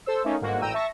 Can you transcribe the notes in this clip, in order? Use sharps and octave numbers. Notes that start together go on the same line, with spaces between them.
A4 C5 E6
A3 A#3 C#4 D#4
G1 G#2 A#3 F#4
A1 G5 A#5 E6 D#7
E5 A5 C#6 A#6